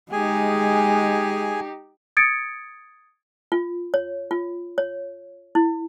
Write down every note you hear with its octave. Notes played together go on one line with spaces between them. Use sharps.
G#3 D#4 G4 G#4 G#5
D#6 G#6 A6 C#7 D7
F4
C#5
F4
C#5
E4